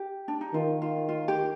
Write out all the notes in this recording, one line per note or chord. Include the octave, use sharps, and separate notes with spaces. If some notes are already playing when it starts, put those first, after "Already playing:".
Already playing: G4
D4
D#4
D#3 F4
F4
F4
G4